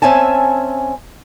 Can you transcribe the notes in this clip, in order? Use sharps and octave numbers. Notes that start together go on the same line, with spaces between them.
C4 C#4 E5 G#5 A5